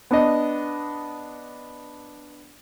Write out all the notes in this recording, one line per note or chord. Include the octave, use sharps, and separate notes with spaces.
B3 D4 D#5